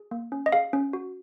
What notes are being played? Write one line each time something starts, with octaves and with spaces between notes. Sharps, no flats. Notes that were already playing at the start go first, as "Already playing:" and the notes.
Already playing: G#4
A#3
C#4
D#5
G#4 F5
C#4
F#4